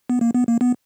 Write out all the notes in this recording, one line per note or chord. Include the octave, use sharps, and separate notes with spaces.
B3
A#3
B3
A#3
B3